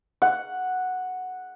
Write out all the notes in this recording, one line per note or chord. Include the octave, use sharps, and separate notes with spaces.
F#5